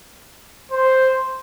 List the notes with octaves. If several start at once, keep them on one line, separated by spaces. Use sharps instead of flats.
C5